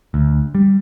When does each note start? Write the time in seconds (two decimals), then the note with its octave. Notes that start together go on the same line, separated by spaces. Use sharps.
0.14 D2
0.55 G3